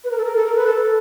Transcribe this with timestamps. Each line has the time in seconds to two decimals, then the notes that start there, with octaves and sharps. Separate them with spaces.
0.04 B4
0.11 A#4
0.18 A4
0.25 A#4
0.36 A4
0.46 A#4
0.56 B4
0.67 A4